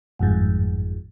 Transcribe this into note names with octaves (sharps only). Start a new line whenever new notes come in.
G1 F2 G#2